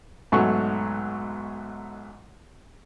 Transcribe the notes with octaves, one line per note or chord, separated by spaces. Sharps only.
B1 G#2 F#3 A3 C#6